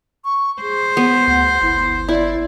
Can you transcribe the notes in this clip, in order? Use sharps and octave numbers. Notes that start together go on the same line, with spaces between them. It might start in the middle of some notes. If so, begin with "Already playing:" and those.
C#6
G#4 C5
B3
D2 F#5
G1 E4
E4 D5